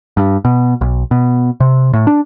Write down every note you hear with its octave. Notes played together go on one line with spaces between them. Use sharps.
G2
B2
B1
B2
C3
A2
D4